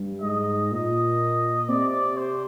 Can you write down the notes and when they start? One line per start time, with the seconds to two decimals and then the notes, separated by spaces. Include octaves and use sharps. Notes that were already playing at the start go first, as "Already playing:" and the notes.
Already playing: G2
0.21 G#2 D#5
0.72 A#2 D#5
1.69 C3 D5
2.17 C5